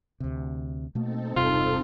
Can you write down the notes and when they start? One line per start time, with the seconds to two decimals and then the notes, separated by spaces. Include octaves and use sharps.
0.20 D2 C3
0.95 B2 A3 A#3 C4 D#4 A4
1.36 E1 G2 C3 F4